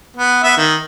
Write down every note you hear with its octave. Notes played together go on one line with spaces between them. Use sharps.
B3
B3 E5
D#3